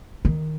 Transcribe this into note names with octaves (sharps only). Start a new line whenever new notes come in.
D#3